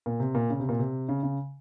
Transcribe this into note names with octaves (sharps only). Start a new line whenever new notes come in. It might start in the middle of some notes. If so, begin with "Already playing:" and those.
A#2
C3
A#2
C#3
C3
A#2
C3
C#3
C#3